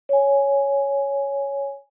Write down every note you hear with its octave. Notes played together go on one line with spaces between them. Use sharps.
C#5 G#5